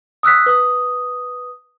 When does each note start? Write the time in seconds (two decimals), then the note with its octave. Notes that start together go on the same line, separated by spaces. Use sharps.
0.23 D#6 E6 F#6 B6
0.46 B4 D#6